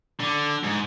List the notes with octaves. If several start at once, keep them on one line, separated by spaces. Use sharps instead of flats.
D3
G#2